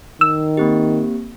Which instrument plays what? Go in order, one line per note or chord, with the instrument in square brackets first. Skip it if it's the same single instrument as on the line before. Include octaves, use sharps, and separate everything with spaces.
[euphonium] D#3 [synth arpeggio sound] E6
[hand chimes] A#3 C4 G4